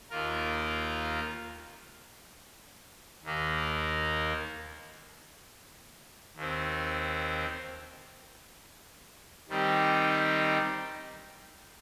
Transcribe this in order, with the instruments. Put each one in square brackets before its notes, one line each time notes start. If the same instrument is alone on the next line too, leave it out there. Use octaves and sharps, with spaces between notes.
[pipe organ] D#2 D#3 A#3 F4 A#4
D#2 D#3 A#3
D#2 D#3 C4
D#3 G3 C4 D#4 G4